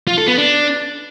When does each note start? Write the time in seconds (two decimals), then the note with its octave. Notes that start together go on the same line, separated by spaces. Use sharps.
0.08 F4
0.18 A4
0.28 B3
0.38 D4